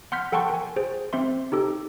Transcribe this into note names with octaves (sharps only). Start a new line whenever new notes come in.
F#5 C6 F6 G6 B6
A4 F#5 G5 A5 C6 C#6
A#4 G#5
G#4 C5
C4 C5 E5 C6
D#4 G4 A4